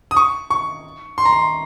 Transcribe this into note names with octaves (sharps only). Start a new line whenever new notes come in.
D#6
C#6
C#6
C6
A#5
C6